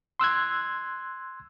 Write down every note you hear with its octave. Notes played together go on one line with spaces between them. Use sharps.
C6 E6 F#6 G#6